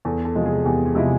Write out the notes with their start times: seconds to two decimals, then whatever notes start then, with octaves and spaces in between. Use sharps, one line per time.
0.05 E2 A4
0.25 A4
0.35 C3 F3 G#3
0.46 G#4
0.65 E2 G4
0.86 G#4
0.95 C3 F3 G#3 E4